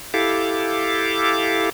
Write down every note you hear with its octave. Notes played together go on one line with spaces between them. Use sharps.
E4 G4 A4 F5 D6